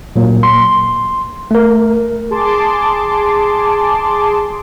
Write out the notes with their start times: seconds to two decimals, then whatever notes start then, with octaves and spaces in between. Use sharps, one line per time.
0.16 A#2 F#3 A#3
0.43 C6
1.51 A3 A#4
2.31 G#4 A5 C6 D6